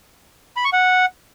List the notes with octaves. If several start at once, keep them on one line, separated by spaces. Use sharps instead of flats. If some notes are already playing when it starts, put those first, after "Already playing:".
B5
C#6
F#5